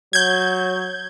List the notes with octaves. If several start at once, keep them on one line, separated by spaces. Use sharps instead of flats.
F#3 G6 G#6